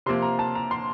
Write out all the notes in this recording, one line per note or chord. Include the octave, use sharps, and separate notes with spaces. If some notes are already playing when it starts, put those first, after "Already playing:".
C3 F3 A#3 C6
A#5
A5
A#5
C6